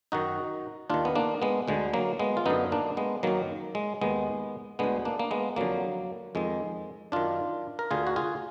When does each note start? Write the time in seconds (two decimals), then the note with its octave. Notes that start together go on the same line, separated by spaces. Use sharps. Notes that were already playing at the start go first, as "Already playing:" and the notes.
0.12 F#2 D#3 D#4 F#4
0.90 D#2 D#3 D4 F4
1.05 B3
1.16 A#3 D4
1.42 G#3 B3
1.68 D2 D3 G#3
1.94 F#3 A#3
2.19 G#3 B3
2.37 F4
2.46 F#2 D3 B3 D#4
2.72 A#3 D4
2.97 G#3 B3
3.23 F#2 D#3 F#3 A#3
3.75 G#3
4.02 D#2 D#3 G#3 B3
4.79 D2 D3 G#3 B3
5.05 A#3 D4
5.20 A#3
5.31 G#3 B3
5.56 F2 D3 F#3 A#3
6.35 F2 D#3 G#3
7.12 F#2 D#3 D4 F4
7.79 A#4
7.91 D2 D3 F4 G#4
8.07 F#4
8.16 F4 G#4